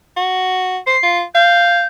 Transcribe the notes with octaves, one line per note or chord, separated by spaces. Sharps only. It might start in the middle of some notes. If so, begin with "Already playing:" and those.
F#4
C5 C7
F4
F5 G6